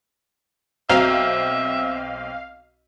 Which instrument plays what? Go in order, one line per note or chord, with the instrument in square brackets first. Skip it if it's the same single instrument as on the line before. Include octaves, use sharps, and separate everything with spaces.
[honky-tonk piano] B1 C4 [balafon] F#4 A#5 [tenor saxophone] E5 [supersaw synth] F5